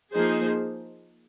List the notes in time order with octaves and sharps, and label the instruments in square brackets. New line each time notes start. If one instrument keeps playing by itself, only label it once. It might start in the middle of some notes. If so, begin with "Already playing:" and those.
[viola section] F3 A#3 D#4 G#4 C5